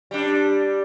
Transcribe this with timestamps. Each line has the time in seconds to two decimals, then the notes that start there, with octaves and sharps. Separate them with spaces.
0.11 G3 D4